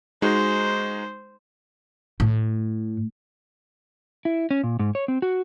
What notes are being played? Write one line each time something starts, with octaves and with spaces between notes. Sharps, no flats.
G#3 D#4 F#4 C5
A2
E4
C#4
A#2
G#2
C#5
C4
F#4